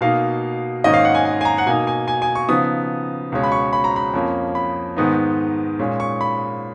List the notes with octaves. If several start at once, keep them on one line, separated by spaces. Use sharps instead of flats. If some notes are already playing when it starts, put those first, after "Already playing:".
B2 A#3 D#4 F5
G#2 D#3 A#3 C#4 D#5
F5
F#5
G#5
G#5
G#5
A#5
F#5
B2 A#3 D#4 G#5
G#5
G#5
G#5
C#6
C#3 F3 B3 D#4 D#6
C#2 B2 G#3 C#4
B5
C#6
B5
A#5
B5
F2 F3 A#3 C#4
B5
G#2 D#3 G#3 B3 D#4
A#2 G#3 C#4
C#6
B5